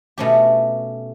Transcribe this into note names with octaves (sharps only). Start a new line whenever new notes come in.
B2 A3 C#4 G4